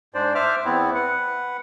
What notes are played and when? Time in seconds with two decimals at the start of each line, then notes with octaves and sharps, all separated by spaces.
0.14 G#2 D4 C5 D5
0.35 C5 E5 D6 F6
0.65 E2 B3 C4 E4
0.95 B4 F#5